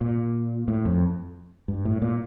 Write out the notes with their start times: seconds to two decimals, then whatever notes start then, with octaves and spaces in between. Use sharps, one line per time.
0.01 A#2
0.68 A2
0.85 F2
1.68 G2
1.85 A2
2.02 A#2